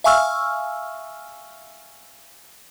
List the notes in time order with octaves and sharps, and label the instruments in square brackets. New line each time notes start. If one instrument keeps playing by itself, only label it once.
[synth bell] E5 F5 G#5 C#6 E6 F6